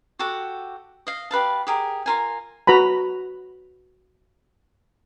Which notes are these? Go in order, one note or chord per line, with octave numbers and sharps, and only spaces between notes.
F#4 G4 A4 F#5
D#5 F5
G4 B4 F5 A5
G4 G#4 A#4
F4 A#4 G#5
F#4 B4 A#5 B5